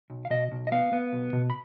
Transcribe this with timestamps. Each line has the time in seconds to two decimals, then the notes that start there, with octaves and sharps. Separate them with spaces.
0.10 B1
0.25 F5
0.30 B2 D#5
0.52 B1
0.67 D#5
0.72 B3 F5
0.93 B3
1.13 B1
1.33 B2
1.50 B5